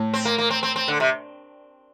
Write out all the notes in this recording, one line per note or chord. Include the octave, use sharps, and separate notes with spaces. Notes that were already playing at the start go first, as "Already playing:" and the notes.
Already playing: A2
C4
A#3
A#3
C4
C4
C4
D3
C3